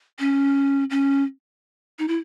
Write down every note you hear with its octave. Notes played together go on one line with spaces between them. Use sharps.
C#4
C#4
D#4
E4